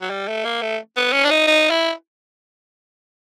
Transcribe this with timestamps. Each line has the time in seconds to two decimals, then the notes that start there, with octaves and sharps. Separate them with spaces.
0.01 F#3
0.10 G3
0.28 A3
0.45 A#3
0.62 A3
0.97 B3
1.12 C#4
1.24 D4
1.30 D#4
1.47 D#4
1.70 E4